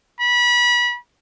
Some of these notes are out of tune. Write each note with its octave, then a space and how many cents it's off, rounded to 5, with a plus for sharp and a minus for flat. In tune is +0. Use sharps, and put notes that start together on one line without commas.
B5 -30